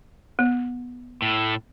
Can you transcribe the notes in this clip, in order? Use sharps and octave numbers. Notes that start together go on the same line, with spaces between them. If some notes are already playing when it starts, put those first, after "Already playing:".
B3
A2